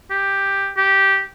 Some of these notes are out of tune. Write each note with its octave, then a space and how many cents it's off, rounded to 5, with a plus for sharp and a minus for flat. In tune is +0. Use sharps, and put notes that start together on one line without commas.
G4 +5
G4 -10